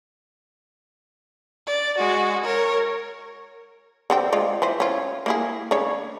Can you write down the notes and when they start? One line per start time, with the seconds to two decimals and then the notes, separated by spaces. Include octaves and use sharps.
1.67 D5
1.98 G#3 F#4
2.44 A#4 C#5
4.10 D3 C4 G4
4.32 G#3 F4 D5
4.62 E3 B4 C5
4.80 C#4 F4
5.26 A#3 E4 G#4
5.71 C#3 D4 C#5